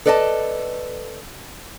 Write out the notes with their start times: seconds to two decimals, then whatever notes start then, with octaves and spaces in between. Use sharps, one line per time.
0.05 A4 B4 D5 D#5 G#5 A5